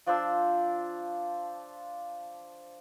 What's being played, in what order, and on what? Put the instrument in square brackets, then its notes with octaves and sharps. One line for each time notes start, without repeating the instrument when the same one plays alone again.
[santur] F3 D4 C5 E6